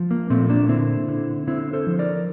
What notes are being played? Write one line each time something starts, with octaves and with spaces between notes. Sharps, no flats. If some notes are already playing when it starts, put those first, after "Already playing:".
Already playing: F3
A#3
A#2 A3 C4
A#3 D4
D3 C4 E4
D3
D3 C4 E4
A4 C5
F3
A#4 D5